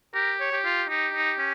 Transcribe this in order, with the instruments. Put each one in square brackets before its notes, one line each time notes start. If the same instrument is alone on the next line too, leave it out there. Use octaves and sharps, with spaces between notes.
[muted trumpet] G4 [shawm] A#4
[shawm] C#5
[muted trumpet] G4
[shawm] F4
[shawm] D#4 [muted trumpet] G4
[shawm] D#4
C#4